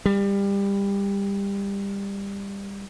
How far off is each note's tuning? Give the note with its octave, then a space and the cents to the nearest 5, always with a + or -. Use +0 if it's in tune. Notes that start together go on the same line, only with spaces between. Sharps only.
G3 +25